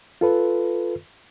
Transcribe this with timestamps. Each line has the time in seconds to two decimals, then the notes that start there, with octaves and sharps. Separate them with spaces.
0.21 F4 A4 B4